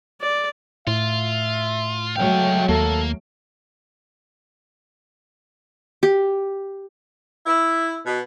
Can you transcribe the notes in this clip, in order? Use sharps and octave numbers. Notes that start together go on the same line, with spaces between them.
D5
A2 F4 E5
F#3 G#3 A3 F5 G5
D#2 A#3 A4
G4
E4
B2